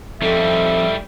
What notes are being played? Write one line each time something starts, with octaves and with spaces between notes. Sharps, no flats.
F2 G3 D#4 A4 E5